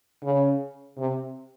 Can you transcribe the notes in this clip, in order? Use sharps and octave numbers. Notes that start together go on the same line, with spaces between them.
C#3
C3